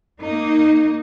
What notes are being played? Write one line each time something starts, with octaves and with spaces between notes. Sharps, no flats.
A#3 D#4